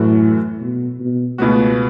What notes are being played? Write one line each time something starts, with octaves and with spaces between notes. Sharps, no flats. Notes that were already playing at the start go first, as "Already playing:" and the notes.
Already playing: F#2 A2 E3 A3 F#4
B2
B2
C#2 B2 A3 B3 F#4